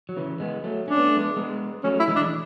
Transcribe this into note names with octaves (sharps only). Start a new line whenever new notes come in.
F#3
C#3 E3
G#3 B3
F#3 A3
C#4 D4
B3
A3
G#3 B3
G#3 B3
F#3 A3 C#4
E4
E3 G#3
D4